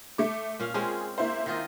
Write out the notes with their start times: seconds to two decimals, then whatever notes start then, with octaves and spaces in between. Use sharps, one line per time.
0.18 A3 D6
0.59 A#2 C#4 F5
0.74 G#3 C4 C#4 G#4
1.18 A#3 E4 C5
1.46 D#3 F4 D#5